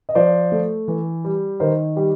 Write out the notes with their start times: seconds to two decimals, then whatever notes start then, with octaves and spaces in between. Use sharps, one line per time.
0.09 D#5
0.15 F3 C5 D5
0.52 A3
0.88 E3
1.25 G3
1.60 D#3 A#4 C5
1.96 G3 G4